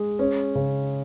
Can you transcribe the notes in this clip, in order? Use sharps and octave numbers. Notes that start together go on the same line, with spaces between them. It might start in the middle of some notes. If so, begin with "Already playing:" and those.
Already playing: G#3
C#4
C#3